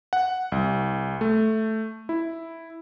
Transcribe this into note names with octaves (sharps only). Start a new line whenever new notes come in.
F#5
C2
A3
E4